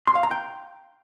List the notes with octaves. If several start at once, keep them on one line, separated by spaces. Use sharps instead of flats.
C6
F5
A#5
G5